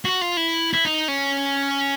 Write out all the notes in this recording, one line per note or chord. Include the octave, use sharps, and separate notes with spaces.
F#4
F4
E4
E4
D#4
C#4